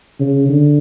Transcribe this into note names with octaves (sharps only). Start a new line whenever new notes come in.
C#3
D3